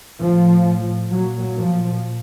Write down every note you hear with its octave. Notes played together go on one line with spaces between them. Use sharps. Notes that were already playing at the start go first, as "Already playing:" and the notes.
A2 F3
A#2 F#3
F3